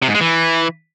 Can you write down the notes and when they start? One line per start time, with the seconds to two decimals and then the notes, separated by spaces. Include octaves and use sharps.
0.02 C3
0.08 G#2
0.15 G#3
0.21 E3